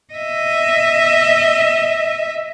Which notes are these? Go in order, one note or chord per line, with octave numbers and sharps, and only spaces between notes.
D#5 E5